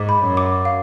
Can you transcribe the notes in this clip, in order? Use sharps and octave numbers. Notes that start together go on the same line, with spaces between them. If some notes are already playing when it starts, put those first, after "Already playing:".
Already playing: G#2 D6
B5
F#2
D6
F5